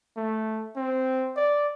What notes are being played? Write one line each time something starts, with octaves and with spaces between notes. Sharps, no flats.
A3
C4
D5